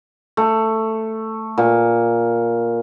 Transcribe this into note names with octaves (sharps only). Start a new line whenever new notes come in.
A3
A#2